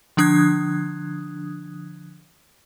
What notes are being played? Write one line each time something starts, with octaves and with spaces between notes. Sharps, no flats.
D3 F3 D4 D#6 F#6 G#6